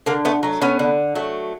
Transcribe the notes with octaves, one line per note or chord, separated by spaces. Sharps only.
D3 A#3
A3 B3
F#3 A3
B3 C#4
D3
F#3 A3